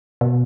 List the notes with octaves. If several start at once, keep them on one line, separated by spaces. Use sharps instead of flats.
B2